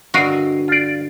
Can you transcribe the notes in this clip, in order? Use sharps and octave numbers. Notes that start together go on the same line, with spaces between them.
G2 D3 F#4 A#4 D#5 F5
F4 D5